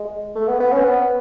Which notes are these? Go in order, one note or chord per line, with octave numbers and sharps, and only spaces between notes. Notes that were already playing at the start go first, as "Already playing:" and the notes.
Already playing: G#3
A3
B3
B3
C#4
B3